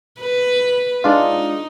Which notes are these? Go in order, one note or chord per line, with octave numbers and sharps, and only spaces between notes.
B4
G#3 D4 D#4 F4